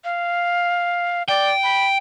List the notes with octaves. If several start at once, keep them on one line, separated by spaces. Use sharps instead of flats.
F5
D5 G5
B5